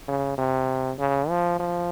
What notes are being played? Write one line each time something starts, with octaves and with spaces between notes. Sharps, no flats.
C#3
C3
C#3
F3
F3